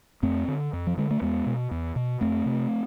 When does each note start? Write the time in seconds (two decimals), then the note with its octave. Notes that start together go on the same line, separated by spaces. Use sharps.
0.23 F2 A3 C4
0.48 D3
0.73 F2
0.87 F3
0.97 D3 G#3
1.11 A3
1.21 E2 G#3 B3
1.46 B2
1.71 E2
1.96 B2
2.21 F2 A3 C4
2.46 C3